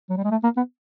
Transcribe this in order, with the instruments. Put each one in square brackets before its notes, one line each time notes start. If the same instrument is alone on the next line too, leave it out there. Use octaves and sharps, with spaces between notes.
[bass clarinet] F#3
G3
G#3
A3
A#3
B3